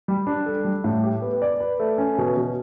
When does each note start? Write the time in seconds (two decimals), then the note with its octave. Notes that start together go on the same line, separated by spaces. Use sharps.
0.08 G3
0.27 D4
0.46 A4
0.64 G3
0.84 A2
1.04 G4
1.22 B3
1.42 D5
1.60 B4
1.79 A3
1.98 C#4
2.18 B2
2.37 B2